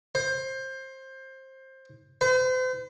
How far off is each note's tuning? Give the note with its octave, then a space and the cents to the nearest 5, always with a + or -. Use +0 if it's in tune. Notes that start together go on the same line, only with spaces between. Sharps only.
C5 +20
C5 -40